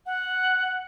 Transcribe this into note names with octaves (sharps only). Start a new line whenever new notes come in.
F#5